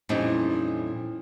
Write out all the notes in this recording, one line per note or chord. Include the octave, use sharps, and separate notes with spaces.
F2 A#2 E3 G3 C#4 D#4